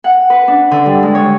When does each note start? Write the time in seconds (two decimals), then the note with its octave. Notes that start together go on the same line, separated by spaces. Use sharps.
0.04 F#5
0.30 B4
0.48 D4
0.71 D3
0.86 G3
1.03 G#3
1.15 C#5